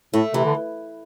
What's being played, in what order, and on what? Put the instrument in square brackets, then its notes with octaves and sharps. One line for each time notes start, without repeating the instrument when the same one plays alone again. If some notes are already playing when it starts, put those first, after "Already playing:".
[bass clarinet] A2 [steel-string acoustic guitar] A3
[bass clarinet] C3 [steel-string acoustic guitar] E3
[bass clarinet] D3